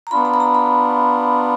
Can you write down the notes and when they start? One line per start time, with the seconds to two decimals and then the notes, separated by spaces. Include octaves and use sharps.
0.07 A#5
0.11 B3 D4 F4 B5
0.25 A#5
0.34 B5
0.40 A#5
0.54 B5